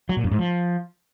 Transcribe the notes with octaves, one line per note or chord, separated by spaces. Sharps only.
F#3
A#2
F#2
G#2
F3